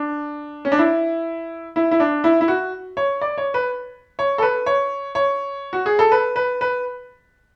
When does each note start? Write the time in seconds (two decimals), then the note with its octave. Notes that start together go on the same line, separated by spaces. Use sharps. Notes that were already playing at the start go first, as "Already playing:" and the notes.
Already playing: D4
0.65 C#4
0.72 D4
0.79 E4
1.76 E4
1.91 E4
2.00 D4
2.24 E4
2.41 E4
2.48 F#4
2.97 C#5
3.21 D5
3.38 C#5
3.54 B4
4.19 C#5
4.38 A4
4.42 B4
4.66 C#5
5.15 C#5
5.73 F#4
5.86 G#4
5.99 A4
6.12 B4
6.36 B4
6.61 B4